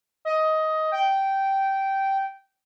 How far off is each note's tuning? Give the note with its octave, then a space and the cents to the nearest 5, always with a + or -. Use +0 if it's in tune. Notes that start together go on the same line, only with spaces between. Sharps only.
D#5 +15
G5 -10